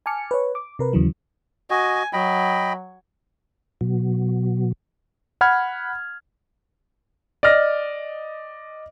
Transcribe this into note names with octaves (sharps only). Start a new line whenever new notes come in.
G#5 A5 D6 F6 C#7
B4 C#5
D6
C3 A#4 B4
D#2 C#3 E3 F#3
F#4 D#5 G#5
F#3 D#5 G5 B5
B2 F#3
F#5 B5 F6 G#6
D5 D#5 F6 A#6